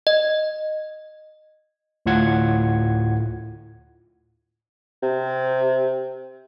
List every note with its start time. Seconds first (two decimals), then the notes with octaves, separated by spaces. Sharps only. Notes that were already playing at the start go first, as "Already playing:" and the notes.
0.07 D#5
2.06 D2 A2 F4 F#5 G#6
5.02 C3